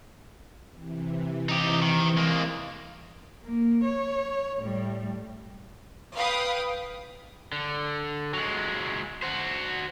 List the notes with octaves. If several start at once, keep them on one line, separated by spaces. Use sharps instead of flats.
C3 E3
D#4 G4
D#3
G#3 A#3
A#3
C#5
A2 G3
B4 F5 G5 D#6
D3
F#3 G#3
F#4 C5